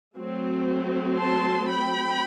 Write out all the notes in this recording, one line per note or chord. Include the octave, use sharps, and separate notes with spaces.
F#3 A3 C4
A5 C6
G5 B5